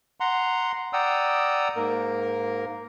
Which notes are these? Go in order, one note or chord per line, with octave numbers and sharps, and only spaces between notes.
F#5 A#5 C6
D5 F#5 G5 A#5 D#6 E6
G#2 A#3 A#4